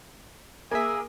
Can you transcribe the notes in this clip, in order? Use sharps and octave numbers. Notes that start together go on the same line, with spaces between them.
A#3 G#4 E5 G#5